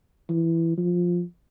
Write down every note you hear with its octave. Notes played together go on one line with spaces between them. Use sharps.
E3
F3